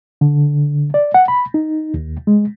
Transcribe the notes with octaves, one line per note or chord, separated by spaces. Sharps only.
D3
D5
F#5
B5
D#4
D#2
G#3